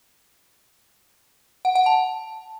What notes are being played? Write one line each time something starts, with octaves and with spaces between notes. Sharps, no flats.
F#5
F#5
A5